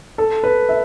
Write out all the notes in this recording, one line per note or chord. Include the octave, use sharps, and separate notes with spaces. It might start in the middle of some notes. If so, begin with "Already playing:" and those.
A4
B4
E5